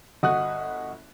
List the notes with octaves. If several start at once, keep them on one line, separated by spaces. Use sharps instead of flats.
G1 F#4 D#5 F#5 D#6 F#6